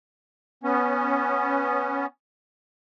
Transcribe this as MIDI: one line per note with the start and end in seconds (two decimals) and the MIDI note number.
0.63 2.06 59
0.63 2.06 61